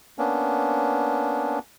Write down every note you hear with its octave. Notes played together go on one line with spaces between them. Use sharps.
A#3 B3 C#4 D4